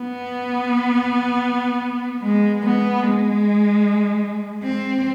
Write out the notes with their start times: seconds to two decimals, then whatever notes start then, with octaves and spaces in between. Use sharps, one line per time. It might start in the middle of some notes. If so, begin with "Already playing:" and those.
Already playing: B3
2.23 G#3
2.64 B3
3.04 G#3
4.63 C4